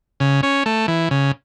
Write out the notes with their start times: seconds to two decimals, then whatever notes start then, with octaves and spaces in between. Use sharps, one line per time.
0.20 C#3
0.43 C#4
0.66 A3
0.88 E3
1.11 C#3